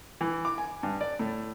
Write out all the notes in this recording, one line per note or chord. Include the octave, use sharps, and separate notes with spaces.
E3
D6
G#5
G2
D5
A2